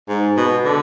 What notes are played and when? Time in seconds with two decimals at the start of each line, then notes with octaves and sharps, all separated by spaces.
0.09 G#2
0.37 B2
0.65 D3